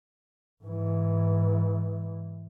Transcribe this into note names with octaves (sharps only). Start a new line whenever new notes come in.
G#2 E3